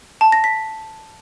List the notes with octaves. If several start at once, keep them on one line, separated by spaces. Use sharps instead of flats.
A5
A#6
B6